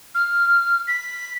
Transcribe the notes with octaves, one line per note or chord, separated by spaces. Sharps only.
F6
B6